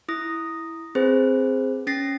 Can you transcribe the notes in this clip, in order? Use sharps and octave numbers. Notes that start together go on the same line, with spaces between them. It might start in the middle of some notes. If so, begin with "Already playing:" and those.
E4 D#6 A#6
C4 G#4 B4 C5
C#4 A6 A#6 C7